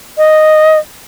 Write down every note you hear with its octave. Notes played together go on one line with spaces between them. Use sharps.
D#5